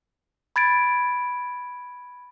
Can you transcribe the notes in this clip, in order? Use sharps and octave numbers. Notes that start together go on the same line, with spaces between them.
B5 G#6 A6 D7